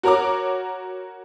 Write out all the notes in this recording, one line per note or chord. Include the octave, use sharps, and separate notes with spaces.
F#4 A#4 C#5 A#5 D6